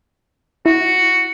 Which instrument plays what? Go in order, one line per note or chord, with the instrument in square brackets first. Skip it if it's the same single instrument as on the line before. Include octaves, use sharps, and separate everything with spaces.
[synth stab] E4 [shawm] F#4